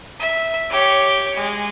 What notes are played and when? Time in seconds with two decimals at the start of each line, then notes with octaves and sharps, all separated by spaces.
0.19 E5
0.70 G4 C#5
1.36 G#3